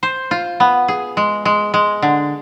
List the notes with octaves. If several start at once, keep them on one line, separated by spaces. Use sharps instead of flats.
C5
F4
B3
G#4
G#3
G#3
G#3
D3